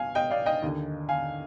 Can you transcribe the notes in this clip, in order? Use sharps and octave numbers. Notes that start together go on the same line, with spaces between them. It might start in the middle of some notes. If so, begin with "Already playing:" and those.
Already playing: B1 B2 F5 G#5
D#5 G5
D5 F5
D#5 G5
D#2 D3
F5 G#5